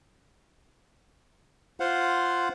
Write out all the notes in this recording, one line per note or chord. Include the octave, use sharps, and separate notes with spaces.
F4 C5 F5 F#5